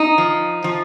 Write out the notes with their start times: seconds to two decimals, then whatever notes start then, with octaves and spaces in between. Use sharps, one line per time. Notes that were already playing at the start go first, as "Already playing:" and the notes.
Already playing: D#4
0.18 F3
0.64 F3